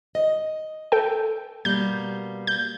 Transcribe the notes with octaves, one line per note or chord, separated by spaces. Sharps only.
D#5
A4 G5
B2 G3 A#3 G6
G6